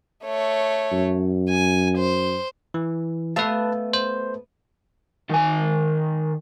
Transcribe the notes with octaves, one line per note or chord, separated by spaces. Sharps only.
A3 C#5
F#2
G#5
C5
E3
A3 B3 B4 F5 A5
C5
D#3 G#5